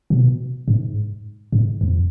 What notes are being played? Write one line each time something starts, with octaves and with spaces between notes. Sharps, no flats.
B2
G#2
G#2
F2